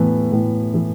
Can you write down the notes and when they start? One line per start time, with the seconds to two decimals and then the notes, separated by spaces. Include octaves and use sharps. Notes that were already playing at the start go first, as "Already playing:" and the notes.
Already playing: A2 E3 B3
0.32 A2
0.74 E3